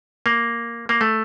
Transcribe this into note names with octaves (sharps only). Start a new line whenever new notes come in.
A#3
A#3
A3